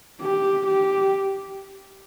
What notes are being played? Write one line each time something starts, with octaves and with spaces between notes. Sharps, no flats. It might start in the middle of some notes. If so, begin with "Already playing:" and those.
G4
G4